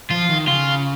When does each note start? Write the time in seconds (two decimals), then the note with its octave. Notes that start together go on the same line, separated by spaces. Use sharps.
0.11 F3 F4
0.30 D#3
0.48 C#3 F4